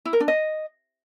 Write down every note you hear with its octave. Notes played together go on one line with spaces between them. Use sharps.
E4
A#4
D4
D#5